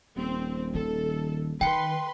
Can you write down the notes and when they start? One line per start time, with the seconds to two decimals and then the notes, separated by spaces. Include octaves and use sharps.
0.17 D#1 C4
0.74 D#3 A4
1.61 D#3 B4 G5 C6 C#7